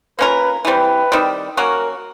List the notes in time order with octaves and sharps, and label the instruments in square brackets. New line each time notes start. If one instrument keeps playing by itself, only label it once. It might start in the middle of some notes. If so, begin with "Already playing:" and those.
[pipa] A#3 C#4 F4 A#4 [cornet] B4
[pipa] E3 G3 C4 [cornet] B4
[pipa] D#3 G3 C4
[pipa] F#3 A#3 C#4 F#4 [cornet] A#4